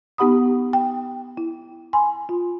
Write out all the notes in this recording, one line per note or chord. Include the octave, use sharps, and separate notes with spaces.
B3 D#4 G4 F#5 B5 D#6
G5
E4
G#5 B5 C6
F4